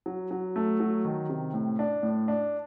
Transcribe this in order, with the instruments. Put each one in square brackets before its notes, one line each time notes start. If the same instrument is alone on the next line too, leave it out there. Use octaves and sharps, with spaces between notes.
[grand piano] F#3
F#3
A3
F#3
D#3
C3
A2
D4
A2
D4